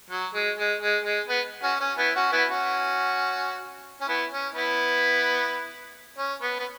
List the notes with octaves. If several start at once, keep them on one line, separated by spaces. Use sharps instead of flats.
F#3
G#3
G#3
G#3
G#3
B3
C#4 F#4
C#4
B3 E4
C#4 F#4
B3 E4
C#4 F#4
C#4
B3 E4
C#4
B3 E4
C#4
B3
B3